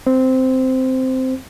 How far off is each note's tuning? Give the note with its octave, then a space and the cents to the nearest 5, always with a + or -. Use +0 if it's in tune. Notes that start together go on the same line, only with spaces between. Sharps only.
C4 -10 C5 -10